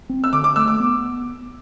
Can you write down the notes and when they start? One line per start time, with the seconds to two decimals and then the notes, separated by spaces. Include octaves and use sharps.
0.09 C4
0.24 E6
0.33 D3 D6
0.44 D6
0.56 A3 E6
0.68 D6
0.80 B3